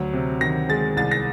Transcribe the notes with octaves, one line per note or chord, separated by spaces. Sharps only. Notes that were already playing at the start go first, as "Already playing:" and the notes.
Already playing: D2 F#3
C3
D#3 A#6
G#3 A6
C2 A6
A#6